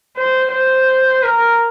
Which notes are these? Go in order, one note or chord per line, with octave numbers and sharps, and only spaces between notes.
C5
C5
A#4